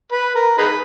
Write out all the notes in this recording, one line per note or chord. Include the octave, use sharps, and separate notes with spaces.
B4
A#4
D#4 G#4 B4